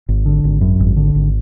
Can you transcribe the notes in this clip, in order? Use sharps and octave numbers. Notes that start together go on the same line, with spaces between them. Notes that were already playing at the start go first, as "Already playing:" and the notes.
G#1
D3
G#1
F#2
G#1
D3
G#1